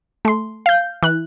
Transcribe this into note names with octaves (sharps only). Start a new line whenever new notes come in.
A3 C6
F5 G6
E3 F#6